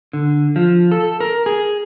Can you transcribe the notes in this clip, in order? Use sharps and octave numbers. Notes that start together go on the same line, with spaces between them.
D3
F3
A4
A#4
G#4